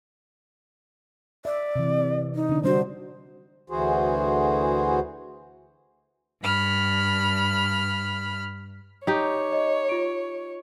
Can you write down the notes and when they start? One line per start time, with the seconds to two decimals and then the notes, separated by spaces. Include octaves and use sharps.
1.45 D5 E5
1.76 C3 E3
2.35 D#4
2.49 D3 D4
2.63 G3 D4 F#4 C5
3.70 D2 E3 F#4 G#4 C5
6.42 G2 B5 F6
9.07 D#4 G4 C#5 G5
9.52 D#5
9.89 F4 D7